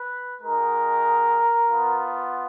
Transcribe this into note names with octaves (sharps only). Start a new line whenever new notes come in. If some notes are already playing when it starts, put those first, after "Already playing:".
Already playing: B4
G#3 D#4 F#4 A#4
B3 F4